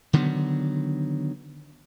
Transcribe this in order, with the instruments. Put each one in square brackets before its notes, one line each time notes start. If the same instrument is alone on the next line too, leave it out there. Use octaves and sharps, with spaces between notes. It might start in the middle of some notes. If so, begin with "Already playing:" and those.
[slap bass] D3 D#3 F#3 B3